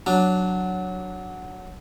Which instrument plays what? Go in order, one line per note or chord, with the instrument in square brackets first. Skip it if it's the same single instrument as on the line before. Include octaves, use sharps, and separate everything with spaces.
[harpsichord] F#3 D4